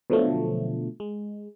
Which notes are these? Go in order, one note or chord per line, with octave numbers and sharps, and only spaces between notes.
B2 D3 F3 F#3 A3
G#3